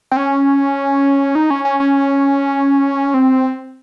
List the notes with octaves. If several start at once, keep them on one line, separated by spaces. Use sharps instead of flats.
C4
C#4
D#4
C#4
C#4
C#4
C4